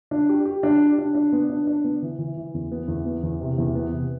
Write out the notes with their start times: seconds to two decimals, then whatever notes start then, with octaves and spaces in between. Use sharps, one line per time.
0.11 D4
0.29 G4
0.45 G4
0.63 D4
0.81 G4
0.98 D4
1.15 D4
1.32 B3
1.49 D4
1.67 D4
1.84 B3
2.02 E3
2.19 E3
2.37 E3
2.54 E2
2.72 B3
2.88 E2
3.06 B3
3.23 E2
3.41 C3
3.58 E2
3.75 B3
3.92 C3